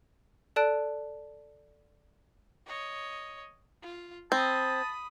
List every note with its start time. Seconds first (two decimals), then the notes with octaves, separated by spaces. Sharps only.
0.56 A4 D5 A5 F#6 D7
2.66 C#5 D#5
3.82 F4
4.32 C4 A5 B5 D#6